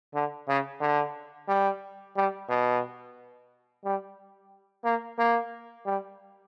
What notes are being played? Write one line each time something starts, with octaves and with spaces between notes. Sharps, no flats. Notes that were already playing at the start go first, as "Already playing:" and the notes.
D3
C#3
D3
G3
G3
B2
G3
A#3
A#3
G3